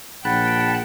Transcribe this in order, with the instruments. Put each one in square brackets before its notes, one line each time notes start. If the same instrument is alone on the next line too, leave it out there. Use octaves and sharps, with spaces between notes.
[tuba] A#1 [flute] F#5 [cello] G5 [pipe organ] A5 B5 F#6